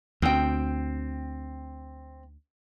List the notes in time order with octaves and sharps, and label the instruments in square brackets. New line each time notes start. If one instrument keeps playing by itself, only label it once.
[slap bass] D2 [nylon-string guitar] C4 G5